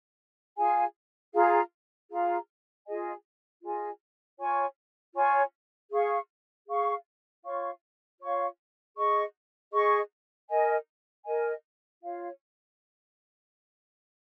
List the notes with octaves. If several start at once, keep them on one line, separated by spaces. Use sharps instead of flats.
F4 G#4 F5 G#5
F4 G#4 F5 A#5
F4 G#4 F5 A#5
F4 G#4 D#5 G#5
F4 G#4 D#5 G#5
F4 C#5 G#5 C#6
F4 C#5 G#5 C#6
G#4 F5 C#6
G#4 F5 C#6
F4 C#5 F5 C#6
F4 C#5 F5 C#6
G#4 D#5 C#6
G#4 D#5 C#6
A#4 D#5 G#5
A#4 D#5 G#5
F4 C#5 F5